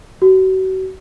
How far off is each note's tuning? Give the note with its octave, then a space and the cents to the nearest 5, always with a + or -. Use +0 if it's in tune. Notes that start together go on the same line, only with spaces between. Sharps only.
F#4 +35